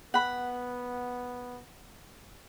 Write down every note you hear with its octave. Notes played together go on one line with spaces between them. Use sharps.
B3 F#5 B5